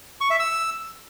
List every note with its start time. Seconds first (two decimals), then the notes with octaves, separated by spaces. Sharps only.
0.21 C#6
0.30 E5
0.40 E6